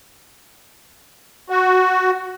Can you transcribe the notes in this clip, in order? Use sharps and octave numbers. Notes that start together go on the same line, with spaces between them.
F#4